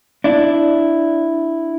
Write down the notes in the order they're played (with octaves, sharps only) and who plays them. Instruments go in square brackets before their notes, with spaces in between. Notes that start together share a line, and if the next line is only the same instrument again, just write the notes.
[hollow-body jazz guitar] D4 E4